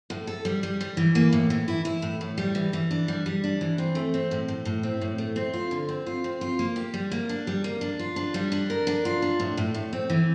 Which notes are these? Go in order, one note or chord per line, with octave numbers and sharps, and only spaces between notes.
A2
A4
G3
G3
G3
E3
A#3
A2
E3
E4
E4
A2
A2
G3
E3
E3
D4
G3
G3
D4
E3
C4
A3
C4
A2
A2
A2
C4
A2
A3
C4
F4
D3
C4
F4
C4
F4
A#3
G4
G3
A#3
D4
G3
A#3
D4
F4
D4
G3
D4
A#4
D4
F4
D4
A2
A2
A2
C4
E3